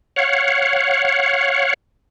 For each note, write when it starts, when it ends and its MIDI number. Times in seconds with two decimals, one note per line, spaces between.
0.16 1.74 73
0.16 1.74 77
0.16 1.74 78